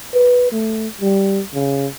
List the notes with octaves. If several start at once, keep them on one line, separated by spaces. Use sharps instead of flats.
B4
A3
G3
C#3